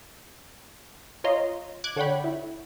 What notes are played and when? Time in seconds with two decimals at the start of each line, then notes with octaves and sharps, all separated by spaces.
1.24 F4 C#5 D#5 A#5 C6
1.84 D6 F#6 G#6
1.96 D3 C#5 F#5 G5 B5
2.24 E4